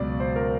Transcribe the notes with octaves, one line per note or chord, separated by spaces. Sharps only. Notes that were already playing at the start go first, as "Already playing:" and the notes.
Already playing: C#2 B2 F#3 D5
C5
A#4